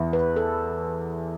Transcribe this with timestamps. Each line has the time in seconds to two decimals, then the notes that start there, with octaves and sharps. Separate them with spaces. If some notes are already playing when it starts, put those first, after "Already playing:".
Already playing: E2 E3 B3 E4
0.13 B4
0.36 A4